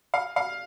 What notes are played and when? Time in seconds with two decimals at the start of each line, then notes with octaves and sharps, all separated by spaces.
0.14 F5
0.36 F5